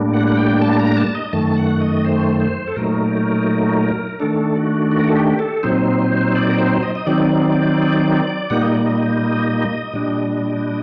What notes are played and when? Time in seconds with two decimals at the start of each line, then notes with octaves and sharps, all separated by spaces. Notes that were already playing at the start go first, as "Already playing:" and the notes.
Already playing: A2 G3 A#3 D4
0.14 F#5
0.27 F#5
0.37 G5
0.61 A5
0.79 A#5
0.97 A5
1.15 D#5
1.33 F#2 D#3 A3 A5
1.57 F#5
1.81 D#5
2.05 C5
2.40 C5
2.67 A4
2.76 A#2 F#3 A3 D#4 A#4
4.20 D#3 A3 D4 A4
4.56 F#4
4.91 F#4
4.99 A#4
5.07 A4
5.15 G4
5.39 A4
5.63 A#2 F#3 C4 D#4 C5
6.35 D5
6.49 A#4
6.59 C5
6.83 D#5
6.95 D#5
7.06 D#3 F#3 C4 D#4 D5
8.50 A#2 G3 A#3 D#4 F#5
8.62 D#5
8.74 D5
8.86 D#5
9.93 A#2 G3 D4